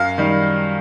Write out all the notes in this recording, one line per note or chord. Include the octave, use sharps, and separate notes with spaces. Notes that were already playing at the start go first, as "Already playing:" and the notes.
Already playing: F#2 F5
D#3 G3